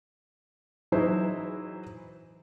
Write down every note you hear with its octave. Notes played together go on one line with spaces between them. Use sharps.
E3 F#3 D#4 E4 G#4 C5